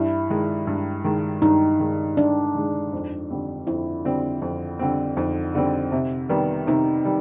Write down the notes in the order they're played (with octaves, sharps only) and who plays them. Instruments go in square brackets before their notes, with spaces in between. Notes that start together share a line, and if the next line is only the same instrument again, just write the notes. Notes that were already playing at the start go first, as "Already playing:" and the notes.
Already playing: [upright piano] G2 [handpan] E4
[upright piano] D#3 G#3
G2
D#3 G#3
[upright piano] G2 [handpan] D#4
[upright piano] D#3 G#3
[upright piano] G2 [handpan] D4
[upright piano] D#3 G#3
F2
D3 G3 C4
[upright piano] F2 [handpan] E4
[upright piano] D3 G3 C4
F2
D3 G3 C4
[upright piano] F2 [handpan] D#4
[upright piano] D3 G3 C4
C3
D#3 G3 B3
[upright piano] C3 [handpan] D#4
[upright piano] D#3 G3